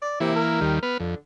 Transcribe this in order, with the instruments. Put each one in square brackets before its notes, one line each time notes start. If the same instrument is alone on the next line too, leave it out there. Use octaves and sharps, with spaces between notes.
[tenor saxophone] D5
[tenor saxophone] C3 [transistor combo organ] E3 A#3 E4
[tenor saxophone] A#4
[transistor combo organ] D#2 D#3 G3
B3 B4 F6
[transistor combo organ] F2 [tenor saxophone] D3